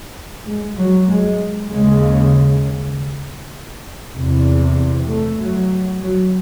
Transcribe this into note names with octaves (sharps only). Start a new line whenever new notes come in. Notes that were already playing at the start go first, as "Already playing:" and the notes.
G#3
F#3
G#3
D#2 C#3 G#3
E2 C3
A3
F#3
F#3